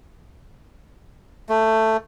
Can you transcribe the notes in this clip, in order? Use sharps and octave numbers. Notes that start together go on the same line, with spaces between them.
A3